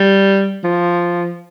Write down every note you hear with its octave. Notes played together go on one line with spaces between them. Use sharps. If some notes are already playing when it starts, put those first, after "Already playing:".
Already playing: G3
F3